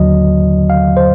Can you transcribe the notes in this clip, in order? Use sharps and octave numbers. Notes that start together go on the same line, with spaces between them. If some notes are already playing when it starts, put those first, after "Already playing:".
Already playing: D#2 D3 F#3 D#5
F5
C5